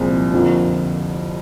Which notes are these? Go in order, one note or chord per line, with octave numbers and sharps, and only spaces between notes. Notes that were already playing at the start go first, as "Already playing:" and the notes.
Already playing: C2 A#2 F3 G#3 C4
F2 D3 F3 A#3